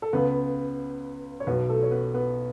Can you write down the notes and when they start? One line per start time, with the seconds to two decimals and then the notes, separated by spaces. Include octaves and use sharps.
0.02 A4
0.13 C#2 C#3 B3 B4
1.40 C#5
1.47 B1 B3 B4
1.51 B2
1.69 A3 A4
1.83 C#5
1.91 B3 B4
2.14 B3 B4